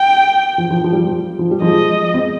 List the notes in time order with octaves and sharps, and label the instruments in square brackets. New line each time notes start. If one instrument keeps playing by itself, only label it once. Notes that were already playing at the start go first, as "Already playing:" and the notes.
Already playing: [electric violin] G5
[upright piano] F3
F3
F3
G3
F3
F3
G3
[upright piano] F3 G#3 [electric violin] D#5
[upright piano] G#3 C4